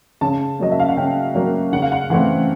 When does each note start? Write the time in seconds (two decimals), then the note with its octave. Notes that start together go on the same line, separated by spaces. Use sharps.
0.21 C#3 A5
0.59 F#3 A#3 D#5
0.72 E5
0.79 F5
0.88 F#5
0.97 C#3 G5
1.35 F#3 A#3
1.73 C#3 F#5
1.82 F5
1.92 F#5
2.10 E3 A3 C4 F#5